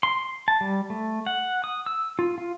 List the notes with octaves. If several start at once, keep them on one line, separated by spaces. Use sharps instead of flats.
C6
A5
G3
A3
F#5
D#6
E6
F4
F4